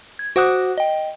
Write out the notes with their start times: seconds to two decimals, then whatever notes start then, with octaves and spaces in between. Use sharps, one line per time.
0.19 G#6
0.36 F#4 C5 F#5 D6 D#6 F#6
0.78 D#5 G5